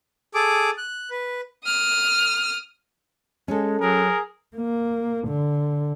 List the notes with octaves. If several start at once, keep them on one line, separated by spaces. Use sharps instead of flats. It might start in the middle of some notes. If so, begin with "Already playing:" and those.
G#4 A4 D6
F#6
B4
D#6 F6
G#3 C#4 A4
F#3 G#4 A#4
A#3
D3